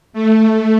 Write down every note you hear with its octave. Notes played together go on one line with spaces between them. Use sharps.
A3